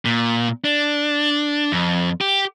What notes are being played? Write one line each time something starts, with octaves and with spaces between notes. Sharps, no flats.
A#2
D4
F2
G4